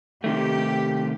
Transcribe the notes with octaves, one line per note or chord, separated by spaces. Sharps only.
C3 D#3 A3 G4